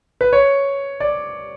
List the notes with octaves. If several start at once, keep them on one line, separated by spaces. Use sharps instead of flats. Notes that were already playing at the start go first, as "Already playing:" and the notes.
B4
C#5
D5